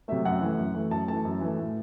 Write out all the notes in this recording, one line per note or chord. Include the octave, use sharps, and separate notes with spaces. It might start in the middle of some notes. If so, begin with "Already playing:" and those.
C3 F#3 A3 E5
F#2 F#5
E3 A3
F#2
E3 A3
F#2 A5
E3 A3 A5
F#2
E3 A3
A2